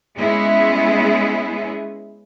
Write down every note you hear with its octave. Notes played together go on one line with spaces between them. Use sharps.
G#3 B3 C#4 E4 G#4